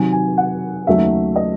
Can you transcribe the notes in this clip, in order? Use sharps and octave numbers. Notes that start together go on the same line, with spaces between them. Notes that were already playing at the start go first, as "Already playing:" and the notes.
Already playing: C3 D#3 F#3 G#5
G#5
F#5
D#2 C#3 F#3 A3 D#4 E5
D#5